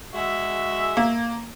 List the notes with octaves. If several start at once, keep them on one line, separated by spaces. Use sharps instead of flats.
G#3 F#4 E5
A#3